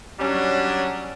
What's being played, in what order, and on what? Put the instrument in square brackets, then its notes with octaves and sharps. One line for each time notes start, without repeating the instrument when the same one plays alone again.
[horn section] F#3 G3 C#4 D4